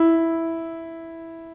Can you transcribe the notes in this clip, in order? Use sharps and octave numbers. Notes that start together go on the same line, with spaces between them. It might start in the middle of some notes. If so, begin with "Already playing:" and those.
Already playing: E4